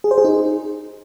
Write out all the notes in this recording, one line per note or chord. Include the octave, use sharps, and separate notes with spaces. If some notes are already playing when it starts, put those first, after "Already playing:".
G#4
C5
G#4
D#4